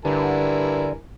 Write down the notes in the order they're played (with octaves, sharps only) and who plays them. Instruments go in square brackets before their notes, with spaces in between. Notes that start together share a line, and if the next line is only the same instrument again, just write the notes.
[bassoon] G2 [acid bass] D3 [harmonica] E4 A#4 G#5